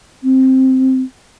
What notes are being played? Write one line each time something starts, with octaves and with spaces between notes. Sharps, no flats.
C4